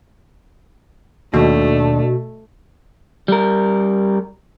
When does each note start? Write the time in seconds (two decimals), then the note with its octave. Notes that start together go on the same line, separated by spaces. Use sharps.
1.34 D#2 B2 A3 D4
3.28 G3 A#4